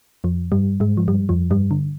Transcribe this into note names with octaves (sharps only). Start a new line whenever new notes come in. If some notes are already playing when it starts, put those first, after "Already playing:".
F2 F3
G2 G3
G#2 G#3
F3
G2 G3
F2 F3
G2 G3
D3